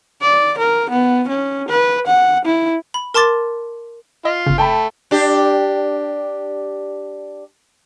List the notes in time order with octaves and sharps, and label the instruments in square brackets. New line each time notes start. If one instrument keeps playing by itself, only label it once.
[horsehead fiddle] D5
A#4
B3
C#4
B4
F#5
E4
[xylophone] B5
A#4 A5 C6 D6 A6
[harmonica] F4 [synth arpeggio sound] D#5
[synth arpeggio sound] G1 C#3
[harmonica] A3 [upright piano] G5 A5 B5
[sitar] D4 G4